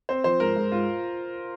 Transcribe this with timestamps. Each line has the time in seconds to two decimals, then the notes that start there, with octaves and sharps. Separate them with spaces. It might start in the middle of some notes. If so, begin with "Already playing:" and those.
0.09 C4 C5
0.24 F3 C5
0.40 G#2 A#4
0.56 G#2
0.72 G#2 F4